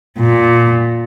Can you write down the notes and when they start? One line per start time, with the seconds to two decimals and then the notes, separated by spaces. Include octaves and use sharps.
0.20 A#2